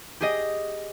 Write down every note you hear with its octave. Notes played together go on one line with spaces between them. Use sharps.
G4 G#4 D#5